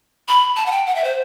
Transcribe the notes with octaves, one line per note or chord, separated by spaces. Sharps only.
B5
A5
F#5
G5
F#5
E5
C5